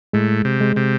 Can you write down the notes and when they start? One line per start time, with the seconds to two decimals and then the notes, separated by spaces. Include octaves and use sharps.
0.13 A2 G#3
0.45 C3
0.60 G#3
0.76 C3